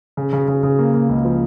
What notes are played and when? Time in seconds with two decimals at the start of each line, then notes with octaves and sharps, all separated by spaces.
0.17 C#3
0.33 C#3
0.48 C#3
0.63 C#3
0.79 A#3
0.94 A#3
1.09 C#2
1.25 F3